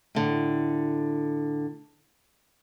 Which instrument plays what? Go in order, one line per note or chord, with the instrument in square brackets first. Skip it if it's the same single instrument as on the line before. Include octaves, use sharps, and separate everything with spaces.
[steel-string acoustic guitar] A2 D3